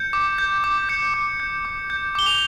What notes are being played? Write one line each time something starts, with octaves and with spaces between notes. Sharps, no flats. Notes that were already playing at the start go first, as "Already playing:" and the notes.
Already playing: G6 C#7
D6
G6
D6
G6 C#7
D6
G6
D6
G6
D6 G7
F7